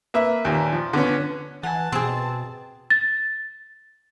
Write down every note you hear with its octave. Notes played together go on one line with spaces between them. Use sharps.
A#3 B4 E5
D#2 A#2
F3
D3 B3 C#4
E3 F#5 G#5 A5
B2 C4 G#4 C5
A6